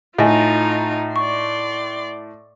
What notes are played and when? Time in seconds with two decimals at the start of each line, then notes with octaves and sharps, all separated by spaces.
0.19 A2 D#4 F4 D#5 G#5
1.16 D5 C6 C#6